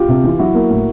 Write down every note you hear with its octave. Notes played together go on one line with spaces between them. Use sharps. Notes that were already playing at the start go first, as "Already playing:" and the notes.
Already playing: F4 G4
C3
E3
F#3 E4 F#4
A#3
A2